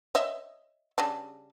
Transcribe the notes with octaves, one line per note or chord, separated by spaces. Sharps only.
C#5 D#5 E5
C#3 G3 D4